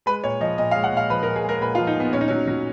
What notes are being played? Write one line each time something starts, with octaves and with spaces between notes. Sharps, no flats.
G#3 B4
A#2 C#5
F3 D#5
A#2 D#5
F5
G#3
F#5
A#2 F5
F3 B4
A#4
A#2
G#4
G#3 A#4
A#2 B4
F4
F3
D#4
A#2 B3
A#2 C#4
D#4
F#3 C#4
F#3